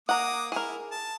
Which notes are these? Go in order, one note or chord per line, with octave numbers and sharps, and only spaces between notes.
A#3 F#5 A#5 D6 D#6
E4 G#4 A#4
A5